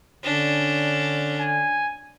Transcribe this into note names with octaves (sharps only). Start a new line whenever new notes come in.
D3 C#4 D4
G#5